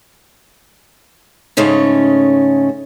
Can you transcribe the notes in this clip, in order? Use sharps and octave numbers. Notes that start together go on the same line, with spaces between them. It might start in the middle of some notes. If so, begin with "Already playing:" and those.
G#2 C#3 A3 C#4